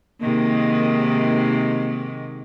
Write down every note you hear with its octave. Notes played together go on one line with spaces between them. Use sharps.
G#2 C3 D#3 A#3